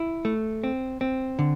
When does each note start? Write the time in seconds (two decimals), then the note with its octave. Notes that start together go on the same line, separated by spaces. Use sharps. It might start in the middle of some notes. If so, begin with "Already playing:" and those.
Already playing: E4
0.25 A3
0.64 C4
1.01 C4
1.39 D3